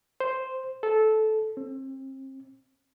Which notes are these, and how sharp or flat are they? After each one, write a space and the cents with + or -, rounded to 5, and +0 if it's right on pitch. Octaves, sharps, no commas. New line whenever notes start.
C5 +0
A4 -15
C4 +35